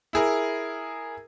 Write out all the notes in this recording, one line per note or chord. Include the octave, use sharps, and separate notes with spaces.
E4 G#4 A#4